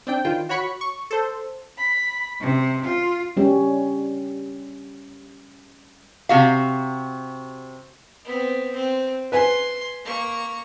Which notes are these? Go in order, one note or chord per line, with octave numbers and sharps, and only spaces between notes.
C4 D4 G5
D#3 E3 F4 G5
F#4 C#5 B5 C#6
C#6
A4 C5
B5
C3
F4
G3 C#4 G4
C3 F#4 F5
B3 C4
C4
B4 G#5 C6
A#3 C#6